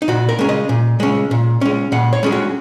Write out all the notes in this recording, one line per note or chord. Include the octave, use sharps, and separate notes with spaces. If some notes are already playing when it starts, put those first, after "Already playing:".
D#4
A#2 F#4
A#4
G#3 C#4
D#5
A#2
G#3 C#4
A#2
G#3 C#4
A#2 F#5
C#5
G#3 C#4 G#4
F#4